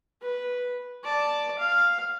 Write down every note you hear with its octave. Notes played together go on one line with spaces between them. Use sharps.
B4
D5 A5
F5